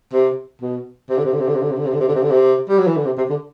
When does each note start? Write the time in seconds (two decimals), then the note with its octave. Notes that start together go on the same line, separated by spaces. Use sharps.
0.13 C3
0.61 B2
1.09 C3
1.18 D3
1.24 C3
1.33 D3
1.40 C3
1.48 D3
1.55 C3
1.62 D3
1.71 C3
1.77 D3
1.86 C3
1.93 D3
2.00 C3
2.08 D3
2.15 C3
2.22 D3
2.30 C3
2.69 G3
2.79 F#3
2.87 E3
2.96 D3
3.05 C3
3.17 C3
3.30 D3